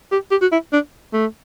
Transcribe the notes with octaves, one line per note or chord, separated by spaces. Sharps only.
G4
G4
F#4
E4
D4
A3